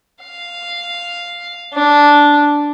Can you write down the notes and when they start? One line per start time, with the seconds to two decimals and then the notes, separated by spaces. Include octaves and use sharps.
0.24 F5
1.73 D4